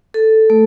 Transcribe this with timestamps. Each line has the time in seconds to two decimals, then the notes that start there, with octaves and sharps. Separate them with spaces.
0.14 A4
0.50 A3